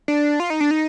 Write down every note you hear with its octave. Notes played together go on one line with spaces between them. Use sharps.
D4
F4
D#4
D4
D#4